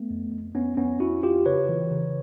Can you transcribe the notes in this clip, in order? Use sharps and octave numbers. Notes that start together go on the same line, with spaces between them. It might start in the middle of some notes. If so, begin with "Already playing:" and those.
Already playing: A3 B3
F2
F2
F2 B3 C#4
F2 B3 C#4
F2 E4 F#4
F2 F4 G4
C#3 B4 C#5
E3
C#3